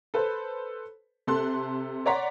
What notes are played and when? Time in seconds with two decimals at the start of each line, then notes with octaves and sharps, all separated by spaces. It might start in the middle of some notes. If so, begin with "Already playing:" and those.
0.14 A4 B4 C5
1.27 C3 A4 C6 F#6
2.06 C#5 D5 F#5 A#5 C6 B6